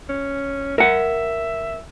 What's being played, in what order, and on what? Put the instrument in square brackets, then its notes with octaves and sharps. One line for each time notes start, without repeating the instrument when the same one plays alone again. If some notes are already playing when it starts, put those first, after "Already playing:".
[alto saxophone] C#4
[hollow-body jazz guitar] A#4 F#5 [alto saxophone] E5